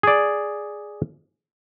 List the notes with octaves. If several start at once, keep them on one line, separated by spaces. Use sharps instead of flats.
G#4 D5